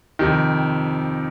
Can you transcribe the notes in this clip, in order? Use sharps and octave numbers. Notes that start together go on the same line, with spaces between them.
F2 C3 D#3